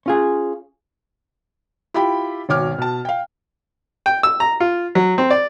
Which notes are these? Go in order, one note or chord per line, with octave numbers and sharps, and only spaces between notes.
C#4 F4 G#4
E4 F4 G4 G5 B5
G#1 B2 C#5 D6 F6
B2 A5
F5 G5
G5
E6
A#5
F4
F#3
C4
D5